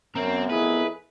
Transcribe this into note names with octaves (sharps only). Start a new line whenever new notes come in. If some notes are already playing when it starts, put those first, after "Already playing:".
F#2 B3 C4 A#4 A#5
F2 E4 G#4 B4